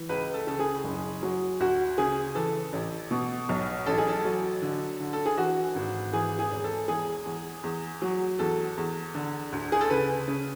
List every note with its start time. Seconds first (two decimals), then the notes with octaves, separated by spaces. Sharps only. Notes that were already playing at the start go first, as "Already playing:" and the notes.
Already playing: E3
0.09 C#2 B4
0.34 A4
0.47 C#3 A4
0.59 G#4
0.84 F#1
1.23 F#3
1.60 D2 F#4
1.98 C#3 G#4
2.35 E3 A4
2.73 A1
3.11 B2
3.49 B1
3.86 A1 A4
3.98 G#4
4.08 A4
4.25 F#3
4.62 D3
5.00 D3
5.13 A4
5.26 G#4
5.37 E3 F#4
5.75 G#1
6.13 E3 G#4
6.39 G#4
6.51 E1
6.64 A4
6.88 E2 G#4
7.26 E2
7.64 E2
8.02 F#3
8.39 E2 A4
8.77 E2
9.14 D3
9.52 D2
9.72 G#4
9.81 A4
9.90 C#3 B4
10.28 C#3